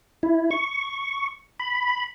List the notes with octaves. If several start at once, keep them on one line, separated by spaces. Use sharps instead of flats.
E4
C#6
B5